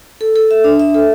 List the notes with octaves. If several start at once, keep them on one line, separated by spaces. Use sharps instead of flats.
A4
A4
E5
D4
E5
A4